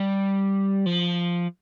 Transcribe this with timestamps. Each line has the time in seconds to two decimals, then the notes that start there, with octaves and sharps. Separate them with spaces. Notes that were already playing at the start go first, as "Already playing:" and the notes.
Already playing: G3
0.87 F3